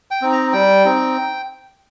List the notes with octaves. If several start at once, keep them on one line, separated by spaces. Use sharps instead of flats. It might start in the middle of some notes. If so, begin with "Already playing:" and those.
G5
C4 D#4
A#5
G3 G5
C4 D#4